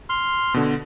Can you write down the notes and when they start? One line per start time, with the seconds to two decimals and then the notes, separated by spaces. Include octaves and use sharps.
0.10 C6 F6
0.54 B2 D3